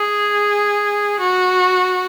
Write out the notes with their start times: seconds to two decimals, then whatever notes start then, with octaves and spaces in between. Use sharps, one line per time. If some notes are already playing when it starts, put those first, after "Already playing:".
Already playing: G#4
1.20 F#4